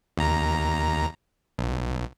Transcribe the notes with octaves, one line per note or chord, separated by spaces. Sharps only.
D#2 A#5
B1